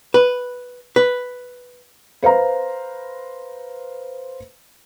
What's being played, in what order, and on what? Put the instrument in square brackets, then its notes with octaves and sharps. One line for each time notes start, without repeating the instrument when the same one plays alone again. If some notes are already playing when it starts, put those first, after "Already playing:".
[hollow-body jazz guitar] B4
B4
[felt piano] B4 C5 F5 A#5